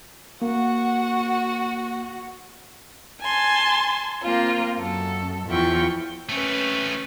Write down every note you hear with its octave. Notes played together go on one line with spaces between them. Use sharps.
A#3 F#4 F#5
G#5 A5 C6
A#3 C4 F4
F#2 A4
E2 F3 E4 F4 G5 C#6
A3 C4 C#4 B4